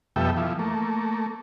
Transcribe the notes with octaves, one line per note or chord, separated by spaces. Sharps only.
F2 B2 G3 A4 E5 G5
E3 F3
A3 A#3